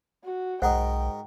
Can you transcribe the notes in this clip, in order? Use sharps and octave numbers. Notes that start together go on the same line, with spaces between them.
F#4
B1 G#2 A#4 C5 D#5 F#5 G5